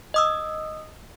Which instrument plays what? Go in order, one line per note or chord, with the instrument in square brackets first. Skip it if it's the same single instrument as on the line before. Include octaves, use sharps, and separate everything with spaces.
[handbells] D#5 D#6 E6